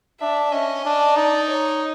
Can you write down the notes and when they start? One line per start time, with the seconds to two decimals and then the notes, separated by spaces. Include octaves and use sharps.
0.20 D4 E5
0.52 C#4 D#5
0.85 D4
1.16 D#4 D5
1.49 C#5